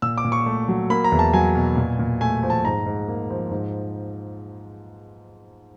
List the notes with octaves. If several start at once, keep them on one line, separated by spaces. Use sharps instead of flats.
A#2 E6
D6
A#2
C#6
A3
F#3
A#3 B5
A#5
E2
A5
F#3 G#5
B2
A#2
A#2
A3 G#5
F3
A5
G#2 A#5
G#2
A#3
F3
G#2